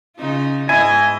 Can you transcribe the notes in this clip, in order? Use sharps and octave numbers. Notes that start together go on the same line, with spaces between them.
C#3 D#4 F4
G#2 E4 D#5 G#5